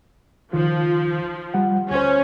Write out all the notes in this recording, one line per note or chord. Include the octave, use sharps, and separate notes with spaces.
C#2 D#3 F3 F4
G3 F#5
D2 C#4 C5